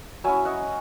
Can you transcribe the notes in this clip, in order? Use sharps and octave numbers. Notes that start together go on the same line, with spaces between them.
F#3 C#4 E4 E5 G#5
D#5 F#5